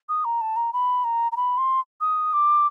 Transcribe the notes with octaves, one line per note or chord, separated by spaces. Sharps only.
D#6
A#5
A5
A#5
B5
A#5
A#5
B5
C6
D#6
D6